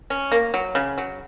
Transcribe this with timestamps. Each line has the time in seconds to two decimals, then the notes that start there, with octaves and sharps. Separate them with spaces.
0.10 C#4
0.32 A#3
0.54 F#3
0.75 C#3
0.98 F#3